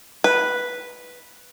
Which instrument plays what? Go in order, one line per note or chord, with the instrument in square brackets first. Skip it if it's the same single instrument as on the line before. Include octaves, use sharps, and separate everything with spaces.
[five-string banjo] B4